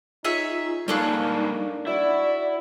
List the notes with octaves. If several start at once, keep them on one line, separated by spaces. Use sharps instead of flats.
D#4 F4 G#4 C#5 E5
G3 G#3 A#3 D4 D#4 A4 C#5 F5
E4 F#4 D5